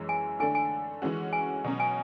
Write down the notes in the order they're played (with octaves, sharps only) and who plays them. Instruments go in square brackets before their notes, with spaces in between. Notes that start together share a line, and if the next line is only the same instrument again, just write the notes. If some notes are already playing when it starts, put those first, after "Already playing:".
Already playing: [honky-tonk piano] F#2 E3 G#3
[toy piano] G#5
[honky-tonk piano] D3 A3 D4 A4 [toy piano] G#5
[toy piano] G#5
[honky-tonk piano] E3 G#3 C#4 F#4
[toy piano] G#5
[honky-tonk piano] B2 F#3 C#4
[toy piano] G#5